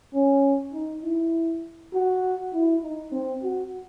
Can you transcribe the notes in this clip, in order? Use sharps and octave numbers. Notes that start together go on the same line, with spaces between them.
C#4
D#4
E4
F#4
E4
D#4
C4
F#4